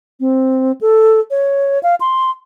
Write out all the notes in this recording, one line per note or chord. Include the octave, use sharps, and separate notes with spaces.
C4
A4
C#5
F5
C6